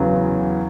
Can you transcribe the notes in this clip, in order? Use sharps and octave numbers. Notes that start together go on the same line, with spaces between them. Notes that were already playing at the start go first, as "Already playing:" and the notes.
Already playing: E2 C#3 F#3